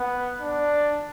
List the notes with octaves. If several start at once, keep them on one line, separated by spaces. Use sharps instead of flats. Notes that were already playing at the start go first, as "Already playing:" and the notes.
Already playing: B3
D4